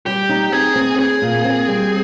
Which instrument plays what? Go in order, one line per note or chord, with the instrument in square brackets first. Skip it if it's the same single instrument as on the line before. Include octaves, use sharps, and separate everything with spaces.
[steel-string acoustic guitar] G3 [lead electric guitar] G4
[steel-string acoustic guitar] D#4
[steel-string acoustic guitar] C4 [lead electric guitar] G#4
[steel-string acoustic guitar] C4
[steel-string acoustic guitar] C4 [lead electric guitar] G#4
[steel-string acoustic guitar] A#2
C4
G3